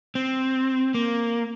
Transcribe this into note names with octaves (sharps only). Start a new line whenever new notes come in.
C4
A#3